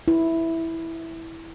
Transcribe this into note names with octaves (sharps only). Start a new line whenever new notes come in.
E4